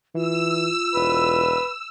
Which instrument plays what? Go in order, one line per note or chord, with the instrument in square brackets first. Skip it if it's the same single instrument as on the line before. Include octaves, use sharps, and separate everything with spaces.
[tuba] E3 [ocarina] F4 [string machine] E6
[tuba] E1 [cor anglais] B4